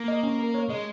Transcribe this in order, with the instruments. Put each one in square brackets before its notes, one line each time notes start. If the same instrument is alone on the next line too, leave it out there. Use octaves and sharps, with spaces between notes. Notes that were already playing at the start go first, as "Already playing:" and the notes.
Already playing: [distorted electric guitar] A#3 [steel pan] A#5
[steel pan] D#5
C#4
A#4
C#5
[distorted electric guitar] G#3 [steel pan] D#5